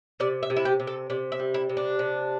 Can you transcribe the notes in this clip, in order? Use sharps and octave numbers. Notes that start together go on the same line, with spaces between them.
C3 D5
E5
C3
E4
G4
C3
A4
C3 D5
E5
G3
E4
C3
D4
C3